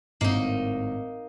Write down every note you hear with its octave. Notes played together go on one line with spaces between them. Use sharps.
G#1 A2 A#3 D#4 D#5